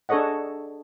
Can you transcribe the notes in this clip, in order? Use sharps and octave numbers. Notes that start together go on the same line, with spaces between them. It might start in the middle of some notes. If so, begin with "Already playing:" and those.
D4 G#4 A4 C#5 D#5 F#5